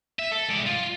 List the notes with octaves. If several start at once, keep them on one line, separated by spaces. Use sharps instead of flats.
E5
A4
G#3 D5
F4